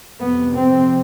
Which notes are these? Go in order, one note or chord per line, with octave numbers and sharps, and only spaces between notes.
F2 C3 B3
C4